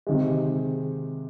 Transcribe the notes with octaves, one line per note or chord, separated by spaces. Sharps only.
C3 D#3 G#3